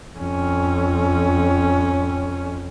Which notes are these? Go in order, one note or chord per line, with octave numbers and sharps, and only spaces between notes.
F2 C#4